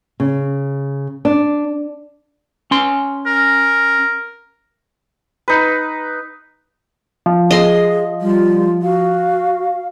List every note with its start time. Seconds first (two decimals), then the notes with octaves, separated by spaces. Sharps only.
0.20 C#3
1.25 D4
2.71 C#4 C6
3.26 A#4
5.48 D#4 B4
7.26 F3
7.51 G#4 D#5 C6
8.21 G3 F4
8.82 F#4 F5